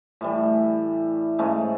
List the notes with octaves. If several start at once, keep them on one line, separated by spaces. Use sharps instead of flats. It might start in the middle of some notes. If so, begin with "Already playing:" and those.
A2 E3 G3
G#2 C#3 A3 G#4